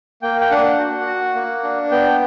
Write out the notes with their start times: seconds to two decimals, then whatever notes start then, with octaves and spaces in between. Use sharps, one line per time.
0.22 A#3 G5
0.41 G5
0.51 D4 F#5
0.79 F#4
1.06 F#4
1.35 A#3
1.63 D4
1.91 B3 G5